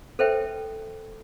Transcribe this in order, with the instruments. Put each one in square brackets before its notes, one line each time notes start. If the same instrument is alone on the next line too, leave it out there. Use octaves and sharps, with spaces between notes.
[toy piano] A4 B4 C5 E5 G5